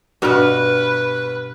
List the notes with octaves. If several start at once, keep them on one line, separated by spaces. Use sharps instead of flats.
G2 B2 F#4 B4 F6